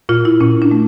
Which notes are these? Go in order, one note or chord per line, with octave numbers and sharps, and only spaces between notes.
A#2 F4
E4
A#2 C#4
D4
A3